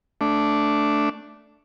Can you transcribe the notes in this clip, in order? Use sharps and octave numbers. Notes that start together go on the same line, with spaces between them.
A3 D4